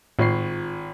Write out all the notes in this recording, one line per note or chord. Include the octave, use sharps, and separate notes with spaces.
G#1 A2 F4 C#6 C7